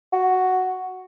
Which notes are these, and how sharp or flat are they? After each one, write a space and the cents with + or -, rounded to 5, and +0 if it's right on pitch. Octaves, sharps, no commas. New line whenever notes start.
F#4 +0